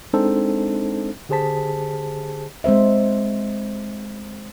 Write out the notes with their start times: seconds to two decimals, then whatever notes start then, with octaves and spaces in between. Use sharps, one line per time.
0.13 G#3 C4 D4 D#4 A4 C5
1.29 D3 G4 G#4 C5 A5 B6
2.64 G#3 C4 C5 E5